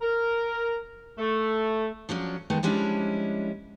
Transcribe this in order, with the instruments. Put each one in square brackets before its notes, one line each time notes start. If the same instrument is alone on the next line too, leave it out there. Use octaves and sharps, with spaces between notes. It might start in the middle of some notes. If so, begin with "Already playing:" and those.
[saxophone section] A#4
A3
[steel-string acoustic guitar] F3 F#3 C#4 D4
D#3 G#3 A3 B3
F3 G3 G#3 C#4 D4 E4